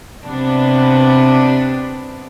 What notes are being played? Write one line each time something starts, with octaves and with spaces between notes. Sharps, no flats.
C3 B3 D4